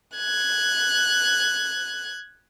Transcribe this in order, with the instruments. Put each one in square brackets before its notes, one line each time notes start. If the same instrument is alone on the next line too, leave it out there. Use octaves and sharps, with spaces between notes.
[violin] F#6 G#6